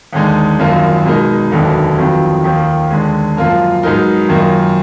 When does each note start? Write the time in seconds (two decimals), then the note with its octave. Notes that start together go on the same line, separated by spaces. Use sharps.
0.13 D#2 D3 G#3 D#4
0.59 G#1 F#2 F3 A#3 F4
1.06 B2 G#3 D#4 A#4
1.52 F1 D#2 D3 F#3 B3
1.98 F2 D#3 F#3 B3 F4
2.44 D#2 D#3 A#3 F4
2.90 D#2 D3 G#3
3.37 F#2 F3 A#3 F4 A#4
3.83 G#2 F#3 B3 D#4 A#4
4.29 F#2 D#3 A#3 F4 A#4